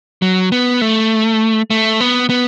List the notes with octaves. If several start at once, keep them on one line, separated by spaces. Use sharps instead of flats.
F#3
B3
A3
A3
B3
B3